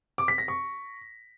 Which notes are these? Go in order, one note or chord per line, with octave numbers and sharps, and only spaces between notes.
D6
B6
A#6
C#6